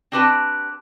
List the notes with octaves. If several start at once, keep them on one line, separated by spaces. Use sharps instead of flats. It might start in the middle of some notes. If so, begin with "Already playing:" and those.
C4 D4 F#4 G4 B4 A5